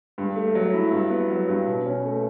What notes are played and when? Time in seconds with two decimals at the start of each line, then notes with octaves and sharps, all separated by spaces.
0.18 G2
0.36 A3
0.55 F#3
0.74 E4
0.92 G2
1.10 B3
1.30 F#3
1.49 G2
1.67 B2
1.86 C#4
2.05 A3